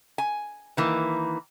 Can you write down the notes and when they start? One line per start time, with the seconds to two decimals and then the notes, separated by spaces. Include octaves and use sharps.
0.18 G#5
0.77 D#3 E3 A#3